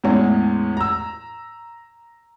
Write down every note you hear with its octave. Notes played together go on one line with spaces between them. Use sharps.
E2 A2 E3 G#3 C#4
A#5 E6